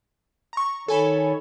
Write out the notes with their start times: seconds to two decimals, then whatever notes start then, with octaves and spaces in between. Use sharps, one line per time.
0.53 A#5 C#6
0.88 D#3 A4 C#5 G#5 B5